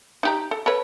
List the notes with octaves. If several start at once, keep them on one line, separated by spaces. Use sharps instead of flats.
D#4 G4 A#5
A4
A4 B4 C#5